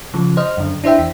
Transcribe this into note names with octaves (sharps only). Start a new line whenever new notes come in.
C#3 F3
C5 D#5 F6
F#2 D3
D4 E4 C5 E5 G5
E2 B6